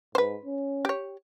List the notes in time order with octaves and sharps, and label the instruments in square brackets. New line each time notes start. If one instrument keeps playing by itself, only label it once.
[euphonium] G#2 [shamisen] B4 C5
[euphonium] C#4
[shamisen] G4 C#5